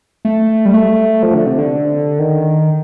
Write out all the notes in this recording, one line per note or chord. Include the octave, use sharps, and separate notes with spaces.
A3
G3
A3
F3
D3
C3
D3
D#3